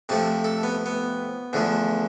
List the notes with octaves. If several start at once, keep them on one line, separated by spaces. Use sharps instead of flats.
F2 C3 F3 A3 A5
A4
B3
B3
E2 D3 F3 A3